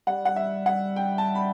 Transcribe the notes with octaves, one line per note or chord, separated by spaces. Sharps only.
G3 F#5
F#5
E5
F#5
G5
A5
B5